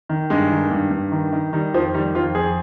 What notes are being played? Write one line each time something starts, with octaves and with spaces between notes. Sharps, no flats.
D#3
G2 G#3
D#3
G2
G2
D#3
D#3
D#3 G3
F2 F3
D#3 G3
F2 F4
F2 G#4